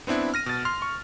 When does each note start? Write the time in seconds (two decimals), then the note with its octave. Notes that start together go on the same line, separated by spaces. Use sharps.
0.07 B3 C4 D4 E4
0.34 F6 A#6 D#7
0.46 B2 A6
0.65 C6 F6
0.82 C#6